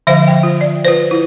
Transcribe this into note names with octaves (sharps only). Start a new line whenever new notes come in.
D3 F3 C5 E5 F5
G5
F4
D5
F4 B4 C5
E4